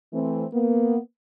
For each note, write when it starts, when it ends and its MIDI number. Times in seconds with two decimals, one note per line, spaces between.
0.13 0.46 52
0.13 0.46 57
0.13 0.46 60
0.54 0.98 58
0.54 0.98 59